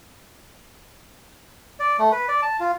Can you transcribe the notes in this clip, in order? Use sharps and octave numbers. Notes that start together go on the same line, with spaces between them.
D5
A3
B4
D5
A5
F4